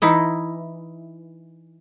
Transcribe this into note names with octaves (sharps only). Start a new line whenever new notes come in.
E3 D#4 E4 D#5